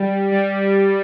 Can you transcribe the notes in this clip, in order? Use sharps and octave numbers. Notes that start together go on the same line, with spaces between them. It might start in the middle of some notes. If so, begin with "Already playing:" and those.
Already playing: G3
G3